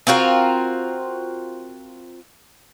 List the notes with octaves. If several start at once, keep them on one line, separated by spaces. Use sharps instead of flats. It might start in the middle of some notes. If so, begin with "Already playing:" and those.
C4 F4 F#4 A#4